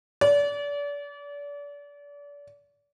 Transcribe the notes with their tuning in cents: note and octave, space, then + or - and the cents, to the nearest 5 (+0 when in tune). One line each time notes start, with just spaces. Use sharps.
D5 -35